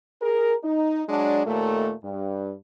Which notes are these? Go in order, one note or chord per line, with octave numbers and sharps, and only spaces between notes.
G#4 A#4
D#4
F#3 G#3 D4
D#2 A#2 A3
G2